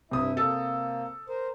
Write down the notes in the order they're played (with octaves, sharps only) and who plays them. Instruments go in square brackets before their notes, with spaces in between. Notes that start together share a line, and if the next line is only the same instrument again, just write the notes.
[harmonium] G2 E4 E5 [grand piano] C3 D#6
[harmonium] A#3 [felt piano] A4
[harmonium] A#4 C5